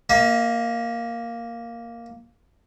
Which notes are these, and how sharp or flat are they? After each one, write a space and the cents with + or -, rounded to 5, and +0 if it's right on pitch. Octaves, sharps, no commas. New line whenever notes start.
A#3 +0 D#5 +45